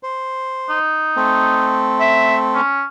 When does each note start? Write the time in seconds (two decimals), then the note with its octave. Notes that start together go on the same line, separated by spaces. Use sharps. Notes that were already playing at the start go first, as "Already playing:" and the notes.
0.03 C5
0.70 D#4
1.16 A3 C4
2.00 E5
2.55 C#4